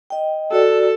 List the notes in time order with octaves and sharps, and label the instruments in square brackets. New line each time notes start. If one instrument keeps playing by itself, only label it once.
[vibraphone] D#5 G5
[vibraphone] F#4 D5 [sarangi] A4